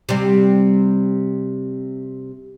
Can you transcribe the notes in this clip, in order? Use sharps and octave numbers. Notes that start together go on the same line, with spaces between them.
C3 G3